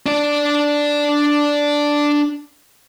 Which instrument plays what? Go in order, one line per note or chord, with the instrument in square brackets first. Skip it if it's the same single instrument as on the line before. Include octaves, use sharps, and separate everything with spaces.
[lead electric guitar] D4 D5